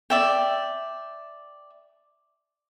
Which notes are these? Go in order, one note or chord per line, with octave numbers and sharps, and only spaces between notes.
D5 E5 G5